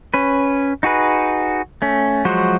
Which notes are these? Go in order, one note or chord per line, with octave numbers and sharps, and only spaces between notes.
C#4 B4
D#4 F#4 G#4 B4
A3 C#4
F3 F#3 G#3 F#4 C5